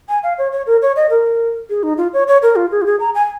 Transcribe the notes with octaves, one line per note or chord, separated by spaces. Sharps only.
G#5
F5
C#5
C#5
A#4
C#5
D#5
A#4
G#4
D#4
F4
C#5
C#5
A#4
F4
G#4
F4
G#4
A#5
G#5